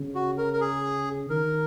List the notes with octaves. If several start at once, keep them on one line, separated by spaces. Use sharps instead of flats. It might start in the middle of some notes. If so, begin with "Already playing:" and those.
Already playing: C#3
F#4
A#4
A#4
G#4
D#3 A#4